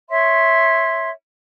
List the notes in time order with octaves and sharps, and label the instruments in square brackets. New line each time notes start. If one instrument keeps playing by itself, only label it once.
[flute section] C#5 E5 C6